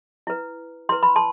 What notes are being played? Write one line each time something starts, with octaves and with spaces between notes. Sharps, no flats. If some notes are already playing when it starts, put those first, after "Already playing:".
E4 B4
E4 B4 C6
B5
A5 C6